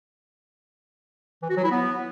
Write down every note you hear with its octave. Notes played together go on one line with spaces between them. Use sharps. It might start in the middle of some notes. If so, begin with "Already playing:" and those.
E3
F#4
F#3
E4
B3